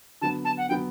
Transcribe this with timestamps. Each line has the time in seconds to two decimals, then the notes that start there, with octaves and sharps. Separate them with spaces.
0.21 D3 F#3 B3 A5
0.45 A5
0.58 F#5
0.68 D3 F#3 B3 G5